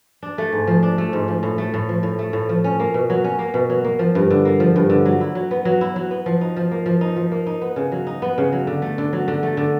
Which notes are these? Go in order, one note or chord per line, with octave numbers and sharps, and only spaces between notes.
D4
A3
G#2
F3
D4
A3
G#2
F3
A2
A3
A2
F3
A2
A3
A2
F3
C#4
A#3
B2
F#3
C#4
A#3
B2
F#3
A#3
F3
G2
D3
A#3
F3
G2
D3
F#3
E4
F#3
B3
F#3
E4
F#3
B3
F3
D#4
F3
A#3
F3
D#4
F3
A#3
D#4
B3
C#3
F#3
D#4
B3
C#3
F#3
D3
A3
D3
F#3
D3
A3
D3